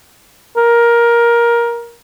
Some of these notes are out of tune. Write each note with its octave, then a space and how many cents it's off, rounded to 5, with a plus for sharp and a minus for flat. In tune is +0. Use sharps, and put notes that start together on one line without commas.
A#4 +15